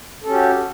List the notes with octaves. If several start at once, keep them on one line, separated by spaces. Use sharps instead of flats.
C#4 F#4 G4 A4